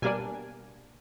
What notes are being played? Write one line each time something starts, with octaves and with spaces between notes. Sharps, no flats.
B2 G3 A#3 D4 G#5